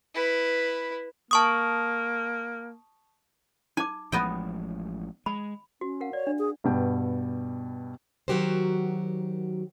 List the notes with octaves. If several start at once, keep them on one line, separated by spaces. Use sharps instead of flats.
E4 B4
A#3 A5 C#6 D#6
D#4 G#5 D6
A1 F3 G#3 B3 D#5 G5
G#3 B5
C#4 F#4
A#4 F5 F#5
C#5 D5
D4
G#4
G2 B2 G5
D#3 F#3 F#4 G4 A#4 C5